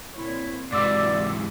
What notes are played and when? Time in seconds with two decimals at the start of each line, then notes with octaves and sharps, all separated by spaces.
0.16 A#2 C4 E4 C#5
0.72 G#2 C3 E3 E4 F#4 D5 D6 E6